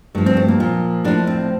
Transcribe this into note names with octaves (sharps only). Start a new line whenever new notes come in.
G2 F3 A3
C4
A3
A#3
A#2 F3
A2 F3 D4
C4